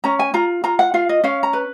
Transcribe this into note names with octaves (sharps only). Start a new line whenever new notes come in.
C#4 A#5
G#5
F4 A#5
F4 A#5
F#5
F4 F5
D#5
C#4 F5
A#5
B4